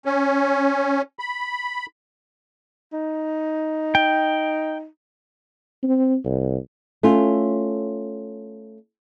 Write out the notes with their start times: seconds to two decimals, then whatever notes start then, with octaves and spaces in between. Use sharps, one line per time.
0.05 C#4
1.19 B5
2.93 D#4
3.95 G5
5.83 C4
6.25 C2
7.03 A3 C#4 F4